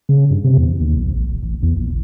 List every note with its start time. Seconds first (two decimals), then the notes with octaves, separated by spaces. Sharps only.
0.09 C#3
0.31 G2
0.44 C3
0.57 E2
0.80 D#2
0.96 B1
1.11 A1
1.30 D#1
1.43 A1
1.63 E2
1.76 A#1
1.90 F#1